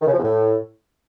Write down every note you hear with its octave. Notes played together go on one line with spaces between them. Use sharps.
D#3
C#3
F3
E2
A2